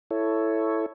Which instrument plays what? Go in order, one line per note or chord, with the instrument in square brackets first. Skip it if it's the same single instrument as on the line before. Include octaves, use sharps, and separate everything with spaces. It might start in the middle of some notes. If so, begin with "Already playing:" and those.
[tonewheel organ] E4 A4 C#5